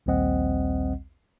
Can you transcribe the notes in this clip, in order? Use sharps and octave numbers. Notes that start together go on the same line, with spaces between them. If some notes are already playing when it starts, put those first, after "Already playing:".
A#1 D#2 G3 C4 D#5 F#5